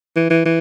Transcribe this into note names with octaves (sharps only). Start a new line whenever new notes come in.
E3
E3
E3